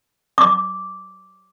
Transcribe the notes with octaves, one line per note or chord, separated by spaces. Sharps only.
D6